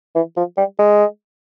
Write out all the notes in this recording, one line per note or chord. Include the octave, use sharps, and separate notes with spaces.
E3
F3
G3
G#3